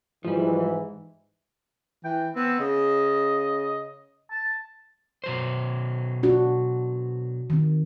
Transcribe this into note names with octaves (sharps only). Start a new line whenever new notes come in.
G#2 E3 F3 G3
E3 G5
B3 C4
C#3 D#5
A5
B2 F#3 C5
D4 F#4
D#3 C4